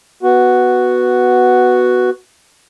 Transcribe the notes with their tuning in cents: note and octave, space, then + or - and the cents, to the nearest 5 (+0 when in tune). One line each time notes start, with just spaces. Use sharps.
B3 +0 F#4 +0